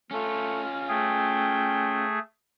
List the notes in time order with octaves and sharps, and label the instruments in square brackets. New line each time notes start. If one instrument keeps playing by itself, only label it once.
[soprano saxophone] A3 [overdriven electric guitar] C#4 F4
[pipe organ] A3 G#4 [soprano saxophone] G5